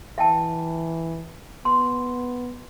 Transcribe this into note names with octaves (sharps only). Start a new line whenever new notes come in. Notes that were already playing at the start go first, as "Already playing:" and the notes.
E3 E5 G5 A5
B3 C6